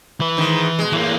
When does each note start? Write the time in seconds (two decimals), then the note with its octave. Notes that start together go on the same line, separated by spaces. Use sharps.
0.20 E3 B4
0.37 G#2 D#3
0.79 B2 G#3
0.92 A2 E3 A#3